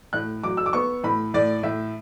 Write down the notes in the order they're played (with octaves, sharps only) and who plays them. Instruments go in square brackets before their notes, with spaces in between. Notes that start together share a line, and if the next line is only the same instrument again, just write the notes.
[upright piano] A2 F#6
F#3 D6
E6
D6
B3 C#6
A2 B5
A2 D5
A2 E5